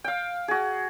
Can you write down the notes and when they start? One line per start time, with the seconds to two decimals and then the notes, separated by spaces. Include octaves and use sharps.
0.04 F5 G5
0.48 F#4 G#4